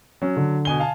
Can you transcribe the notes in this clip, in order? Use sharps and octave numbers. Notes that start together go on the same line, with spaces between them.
F#3 C#4
D3
B2 G#5 G7
F5 G#5 A5